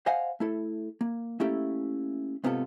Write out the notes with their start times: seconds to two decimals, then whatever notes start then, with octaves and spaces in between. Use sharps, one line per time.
0.06 C5 D#5 F5 F#5 G#5
0.40 A3 E4 A4
1.01 A#3
1.40 A3 A#3 C#4 E4 G4 A4
2.44 G#2 C3 B3 F4 G4 A4